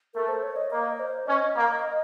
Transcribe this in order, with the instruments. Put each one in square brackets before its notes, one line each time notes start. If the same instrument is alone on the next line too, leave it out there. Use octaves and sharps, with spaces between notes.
[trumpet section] A3 [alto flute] A#4
[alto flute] C5
C#5
D#5
[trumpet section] A#3 [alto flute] D#5
[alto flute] C5
[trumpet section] C#4 [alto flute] D#5
[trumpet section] A#3